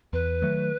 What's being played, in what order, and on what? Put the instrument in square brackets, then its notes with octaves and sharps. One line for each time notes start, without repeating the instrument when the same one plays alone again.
[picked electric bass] E2 [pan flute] B4
[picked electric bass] D#3 F#3 A3